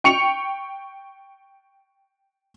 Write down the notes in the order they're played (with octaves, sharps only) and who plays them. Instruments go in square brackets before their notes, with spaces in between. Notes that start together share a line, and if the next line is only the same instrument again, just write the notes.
[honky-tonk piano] G5 C#6 C#7 F7